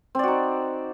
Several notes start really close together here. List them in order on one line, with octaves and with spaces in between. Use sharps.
C4 D5 F#4 D#4